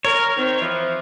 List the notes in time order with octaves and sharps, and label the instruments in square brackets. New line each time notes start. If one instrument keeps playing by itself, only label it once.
[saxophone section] A#4 [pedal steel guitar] C#5
[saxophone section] D#3 C4
E3 F3